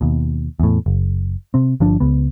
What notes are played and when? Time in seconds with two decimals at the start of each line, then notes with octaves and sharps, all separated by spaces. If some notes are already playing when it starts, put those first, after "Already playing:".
0.01 D#2 B2
0.60 E2 A2
0.86 F#1
1.54 C3 C4
1.80 G1 F3 D4
2.00 C#2 B3